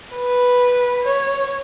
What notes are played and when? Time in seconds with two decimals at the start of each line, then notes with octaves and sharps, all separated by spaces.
0.15 B4
1.04 C#5